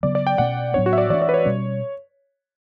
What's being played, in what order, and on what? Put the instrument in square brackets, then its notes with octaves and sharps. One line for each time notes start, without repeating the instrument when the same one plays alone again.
[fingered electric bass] C#3 F#3 B3 [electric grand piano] D5
[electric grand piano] D5
G5
[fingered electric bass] B2 A3 C#4 [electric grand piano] F#5
[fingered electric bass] A2 F#3 B3 D4 [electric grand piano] C#5
[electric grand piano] F#4
E5
D5
[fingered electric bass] E3 A3 D4 [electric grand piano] D5
[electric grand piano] D5
B4
C#5
[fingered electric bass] B2 G3 C#4